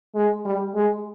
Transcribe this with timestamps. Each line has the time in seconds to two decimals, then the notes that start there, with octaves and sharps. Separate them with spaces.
0.15 G#3
0.45 G3
0.75 G#3